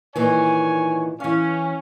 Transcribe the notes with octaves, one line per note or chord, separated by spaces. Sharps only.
A#2 D#3 E3 C#5 G#5
E3 C#4 F5